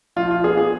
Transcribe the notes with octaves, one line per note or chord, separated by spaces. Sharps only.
F3 F4
F4
B3 G#4
G#4